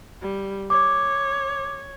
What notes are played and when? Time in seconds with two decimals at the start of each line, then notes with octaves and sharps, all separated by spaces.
0.22 G3
0.70 C#5 D6